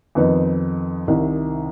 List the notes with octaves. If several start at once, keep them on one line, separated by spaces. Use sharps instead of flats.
F2 D#3 B3 D#4
C2 C3 D#3